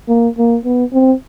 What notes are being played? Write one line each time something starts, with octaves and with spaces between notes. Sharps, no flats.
A#3
A#3
B3
C4